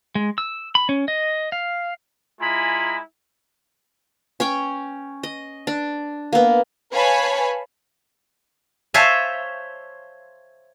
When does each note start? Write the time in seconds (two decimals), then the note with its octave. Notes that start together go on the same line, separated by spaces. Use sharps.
0.15 G#3
0.38 E6
0.75 B5
0.89 C#4
1.08 D#5
1.52 F5
2.40 G#3 E4 F4 G#5 A#5 B5
4.40 C#4 C#5 G5
5.23 D#5
5.67 D4
6.33 A#3 B3
6.92 B4 C#5 F5 G#5 A5 B5
8.94 C5 C#5 E5 F5 G#5 A5